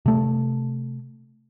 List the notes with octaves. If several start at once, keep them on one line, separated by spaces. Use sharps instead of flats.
C3 A3